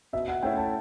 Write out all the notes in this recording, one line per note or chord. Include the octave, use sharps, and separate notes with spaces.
B2 E5
F#5
A3 C#4 E4 G5
A5